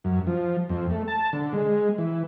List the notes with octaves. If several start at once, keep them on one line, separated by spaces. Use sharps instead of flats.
F#2
F3
F2
A3
A5
D3
G#3
E3